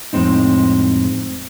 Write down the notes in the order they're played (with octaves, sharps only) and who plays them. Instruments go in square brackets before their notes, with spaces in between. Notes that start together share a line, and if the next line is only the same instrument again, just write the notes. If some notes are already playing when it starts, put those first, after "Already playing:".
[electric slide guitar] F2 A2 G#3 C4 D#4